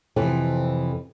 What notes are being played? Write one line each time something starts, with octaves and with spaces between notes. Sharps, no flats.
F2 C3 E3 A4